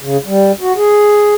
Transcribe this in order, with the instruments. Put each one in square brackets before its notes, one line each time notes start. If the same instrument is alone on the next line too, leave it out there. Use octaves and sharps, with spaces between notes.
[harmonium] C#3
G3
F#4
G#4